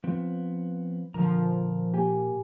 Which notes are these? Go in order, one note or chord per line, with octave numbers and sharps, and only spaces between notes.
F3 B3 C4
A#2 D3 F3 A#4 A#5
A#3 G4 G#5